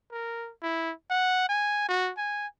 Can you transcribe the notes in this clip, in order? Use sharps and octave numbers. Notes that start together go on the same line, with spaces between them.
A#4
E4
F#5
G#5
F#4
G#5